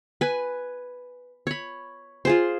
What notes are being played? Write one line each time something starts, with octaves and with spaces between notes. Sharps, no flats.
B4 G#5
C#5 B5
F4 G#4 C5